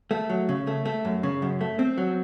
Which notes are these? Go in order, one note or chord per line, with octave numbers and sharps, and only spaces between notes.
A3
F#3
C#3
A3
A3
F#2
C#3
F#2
A3
C4
F#3